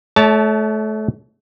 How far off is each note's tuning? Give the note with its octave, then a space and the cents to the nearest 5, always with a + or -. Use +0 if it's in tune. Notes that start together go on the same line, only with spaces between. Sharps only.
A3 -30 C#5 +25 A5 -5